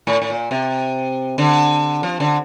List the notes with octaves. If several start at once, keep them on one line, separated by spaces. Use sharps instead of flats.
A2
A2
A#2
C3
D3
F3
D3